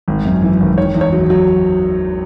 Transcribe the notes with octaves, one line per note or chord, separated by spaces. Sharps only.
G#1
F#2
E3
G#1
D#3 C#5
E2
C#5
F#3
F#3